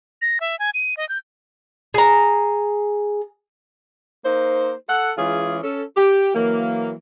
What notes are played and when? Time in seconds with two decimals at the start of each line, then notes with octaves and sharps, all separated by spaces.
0.22 A#6
0.40 E5
0.59 G#5
0.74 D#7
0.97 D#5
1.09 G6
1.94 G#4 A#5
4.25 A#3 D#4 C5
4.89 A4 F#5
5.18 E3 G#3 C#4 F4 G#4
5.63 C#4 A4
5.97 G4
6.35 E3 F#3 A#3